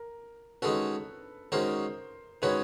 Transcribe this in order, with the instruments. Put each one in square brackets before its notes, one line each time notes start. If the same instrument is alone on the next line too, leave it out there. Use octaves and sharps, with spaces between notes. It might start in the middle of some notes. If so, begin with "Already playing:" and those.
Already playing: [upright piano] A#4
[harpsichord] D#3 G#3 C#4 F#4 [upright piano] A4 B4
[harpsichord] D#3 G#3 C#4 F#4 [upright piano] A#4 C5
[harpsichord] D#3 G#3 C#4 F#4 [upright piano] B4 C#5